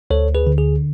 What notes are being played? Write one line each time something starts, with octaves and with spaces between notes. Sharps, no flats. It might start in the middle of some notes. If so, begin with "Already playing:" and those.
D2 A4 C#5
G#4 B4
D3
G#4